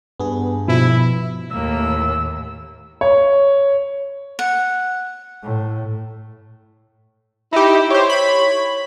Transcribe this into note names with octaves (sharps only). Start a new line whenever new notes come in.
G2 B3 G#4
B2 F3 E4
D#2 A2 A#3 E6
C#5
F#5
A2
D#4 E4 G4
G4 C5 C#5
B5